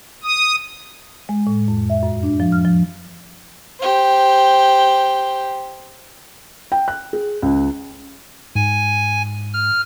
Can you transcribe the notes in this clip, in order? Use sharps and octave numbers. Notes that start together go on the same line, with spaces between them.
D#6
G#3
A2
F2
E5
F#2
D4
F3
F6
F3
G4 C5
G5
F#6
G#4
C#2
G#2 G#5
F6